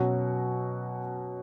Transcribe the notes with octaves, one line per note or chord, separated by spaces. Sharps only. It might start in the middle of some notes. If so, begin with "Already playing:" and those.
Already playing: B2 F#3 C#4 F#4